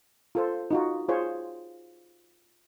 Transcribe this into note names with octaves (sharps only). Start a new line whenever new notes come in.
F4 A4 C5
D#4 F4 F#4
F4 G#4 C5 C#5